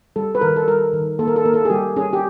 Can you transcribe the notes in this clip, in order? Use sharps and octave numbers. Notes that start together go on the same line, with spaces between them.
G3 A4
B4
D#3 A#4
A4
G3 A#4
D#3
A#3 A4
A#4
A4
A#3 A#4
A4
G#4
G3 G4
C#4 G#4
G4